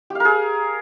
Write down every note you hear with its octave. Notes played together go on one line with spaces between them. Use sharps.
G4 G#4 A#4 F5